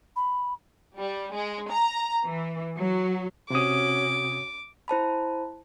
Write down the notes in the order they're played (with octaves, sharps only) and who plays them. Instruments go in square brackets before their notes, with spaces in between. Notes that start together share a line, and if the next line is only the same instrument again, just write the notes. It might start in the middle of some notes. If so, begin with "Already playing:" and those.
[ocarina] B5
[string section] G3
G#3
A#5
E3
F#3
[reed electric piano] C3 D#6 [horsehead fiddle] C#4 F#4 [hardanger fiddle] D6
[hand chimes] E4 C5 A5 B5